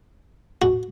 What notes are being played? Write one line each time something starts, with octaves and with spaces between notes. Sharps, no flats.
F#4